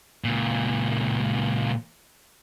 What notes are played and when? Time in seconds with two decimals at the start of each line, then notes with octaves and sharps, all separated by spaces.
0.24 C#2 A#2